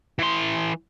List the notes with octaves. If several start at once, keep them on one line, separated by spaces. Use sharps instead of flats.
E3 C6